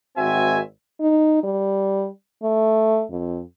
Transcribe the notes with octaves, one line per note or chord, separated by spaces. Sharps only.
G#1 D#3 C4 F#4 E5 G#5
D#4
G3
A3
F2